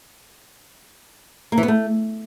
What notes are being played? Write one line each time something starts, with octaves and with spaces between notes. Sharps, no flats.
A#3
E3
B3
A3